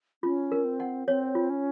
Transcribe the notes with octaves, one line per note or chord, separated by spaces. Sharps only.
C#4 F4
A#4
C4
F#5
C4 C#5
F4
C#4